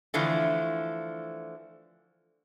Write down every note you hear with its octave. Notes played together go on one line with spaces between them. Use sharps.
D3 E3 F3 A3